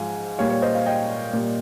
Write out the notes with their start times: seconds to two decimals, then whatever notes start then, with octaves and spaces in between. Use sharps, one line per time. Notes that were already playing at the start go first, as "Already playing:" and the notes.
Already playing: G#2 F3 G#3 F5 G#5
0.39 A#2 G3 C#5 F5
0.50 C#5
0.62 C5 D#5
0.75 F5
0.86 D#5 G5
1.33 A#2 G3